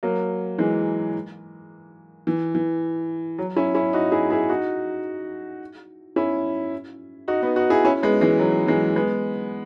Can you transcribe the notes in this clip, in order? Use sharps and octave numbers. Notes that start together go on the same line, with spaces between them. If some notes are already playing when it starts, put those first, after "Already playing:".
F#3 A#3
E3 G#3
E3
E3
F#3
C#4 E4
C#4 E4
D#4 F#4
E4 G#4
E4 G#4
D#4 F#4
C#4 E4
D#4 F#4
B3 D#4
D#4 F#4
E4 G#4
C#4 E4
G#3 B3
E3 G#3
F#3
E3 G#3
G#3 B3